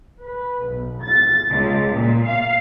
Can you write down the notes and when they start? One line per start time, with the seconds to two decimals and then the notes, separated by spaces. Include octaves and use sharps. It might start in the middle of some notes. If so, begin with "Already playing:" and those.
0.22 B4
0.65 B1
1.02 A6
1.49 C#2
1.94 A#2
2.26 F5